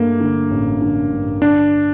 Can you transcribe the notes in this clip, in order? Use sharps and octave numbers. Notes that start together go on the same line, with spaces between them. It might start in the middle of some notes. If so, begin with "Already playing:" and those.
Already playing: G2 A3 A#3
D3
A1
D3
G2
D3 D4